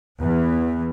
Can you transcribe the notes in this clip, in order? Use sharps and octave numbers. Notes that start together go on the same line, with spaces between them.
E2 E3